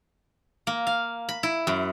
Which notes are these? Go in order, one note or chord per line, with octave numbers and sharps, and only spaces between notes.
A#3
F5
B5
E4
F#2